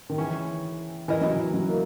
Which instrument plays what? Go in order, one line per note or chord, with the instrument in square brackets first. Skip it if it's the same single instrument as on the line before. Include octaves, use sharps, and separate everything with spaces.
[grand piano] D#3
[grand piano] E3 [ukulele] C#4 E4 G#4
[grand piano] E3 [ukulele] E4 A#4 D#5
[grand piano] F#3
E3
F#3
A#3